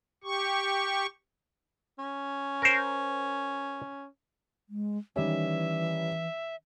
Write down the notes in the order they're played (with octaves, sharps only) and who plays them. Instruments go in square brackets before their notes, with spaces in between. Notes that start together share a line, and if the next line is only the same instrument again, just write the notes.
[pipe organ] G4 C#6
[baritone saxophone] C#4
[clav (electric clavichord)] A#4 C5
[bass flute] G#3
[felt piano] D#3 G3 C#4 [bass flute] E3 [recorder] E5